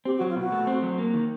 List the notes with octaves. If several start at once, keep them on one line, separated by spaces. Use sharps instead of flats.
C4 G4
F#4
F#3
F4
B2 F#4
A3
C4
F#3
A#3
D#3